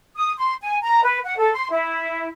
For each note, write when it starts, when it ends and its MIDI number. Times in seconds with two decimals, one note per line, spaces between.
0.16 0.32 87
0.36 0.53 84
0.62 0.76 80
0.82 1.02 82
1.03 1.18 71
1.24 1.36 78
1.37 1.51 69
1.53 1.67 84
1.70 2.27 64